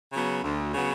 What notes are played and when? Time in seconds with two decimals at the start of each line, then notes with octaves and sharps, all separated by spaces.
0.13 C#3 F#3 B3
0.43 D2
0.74 C#3 F#3 B3